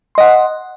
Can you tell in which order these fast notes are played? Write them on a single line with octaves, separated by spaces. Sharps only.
C6 D#5 F#5